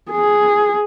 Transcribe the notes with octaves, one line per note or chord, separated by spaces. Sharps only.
G#4